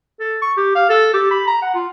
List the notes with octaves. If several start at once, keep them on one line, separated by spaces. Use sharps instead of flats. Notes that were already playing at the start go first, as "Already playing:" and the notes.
A4
C#6
G4
F5
A4
G4
B5
A#5
F#5
F4